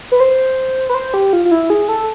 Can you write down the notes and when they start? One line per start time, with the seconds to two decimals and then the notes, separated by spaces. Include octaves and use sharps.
0.12 B4
0.20 C5
0.89 B4
0.95 C5
1.14 G4
1.33 F4
1.45 F4
1.51 E4
1.70 G#4
1.88 A4